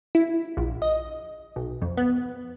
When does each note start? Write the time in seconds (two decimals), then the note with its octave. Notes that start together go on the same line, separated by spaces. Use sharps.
0.15 E4
0.57 A#1
0.82 D#5
1.56 B1
1.82 F2
1.97 B3